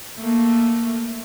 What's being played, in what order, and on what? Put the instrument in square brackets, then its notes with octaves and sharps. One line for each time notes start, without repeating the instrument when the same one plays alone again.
[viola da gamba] A3 A#3